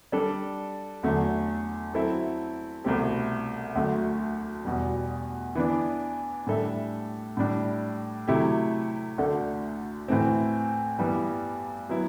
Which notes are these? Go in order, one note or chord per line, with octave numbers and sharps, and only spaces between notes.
G3 D4 A4 D5
E2 D3 F#3 A3
F#3 C4 E4 A4 E5
C2 B2 A3 C4 G4
D2 D3 F#3 A3
E2 B2 G3
E3 B3 D4
A2 G3 D4 A4 E5
A2 G3 D4
C3 F#3 A3 E4 G4
D2 D3 A3 D4 A4
A2 E3 A3 C4
G2 E3 G3 B3
F#3 B3 E4